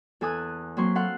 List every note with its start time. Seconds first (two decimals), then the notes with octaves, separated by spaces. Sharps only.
0.21 E2 A4 G#5 D#6 F#6
0.77 F#3 A#3 C4 C6 C#6
0.95 A4 F5 F#5 C6